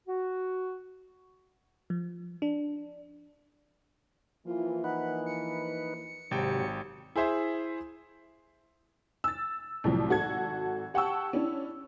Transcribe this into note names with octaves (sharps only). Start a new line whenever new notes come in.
F#4
F3
D4
E3 F3 A#3 F4
D#4 B4 F#5
C#7
G#1 C3 F#3 C4 G4 G5
E4 G#4 C5 E5
E6 A6
C2 A2 F3 F#3
G#1 F#4 A4 G#6
G4 F#5 G5 A5 C#6 E6
C#4 D4 E4